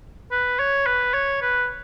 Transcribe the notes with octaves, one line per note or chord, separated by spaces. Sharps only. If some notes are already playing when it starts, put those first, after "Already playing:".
B4
C#5
B4
C#5
B4